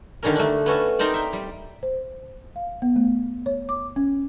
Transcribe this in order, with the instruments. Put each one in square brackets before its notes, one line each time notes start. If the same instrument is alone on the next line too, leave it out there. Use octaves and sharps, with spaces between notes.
[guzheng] D3 D#3 G3 C#4 A#4
A3 D4
B3 C#4 F#4 A4
C4 D#4 A#4 C5 D5
E5 G5
G3
[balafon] C5
F5
B3
A3
C#5
D6
C#4